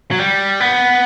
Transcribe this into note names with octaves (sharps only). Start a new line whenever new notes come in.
F#3
G3
B3